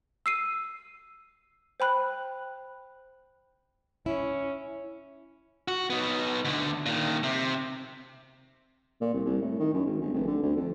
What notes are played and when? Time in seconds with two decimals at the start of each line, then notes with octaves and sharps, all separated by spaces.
0.26 E6 C7 D#7
1.80 C5 G5 B5 F#6
4.06 C#4 E4
5.68 F#4
5.90 B3 D#4
6.45 D2 D3
6.86 A#2 D#3
7.24 C3
9.01 A#2
9.14 C2
9.25 C2
9.41 A2
9.59 D#3
9.74 F#2
9.85 G#1
10.02 G1
10.14 F1
10.27 D3
10.42 D2
10.56 F2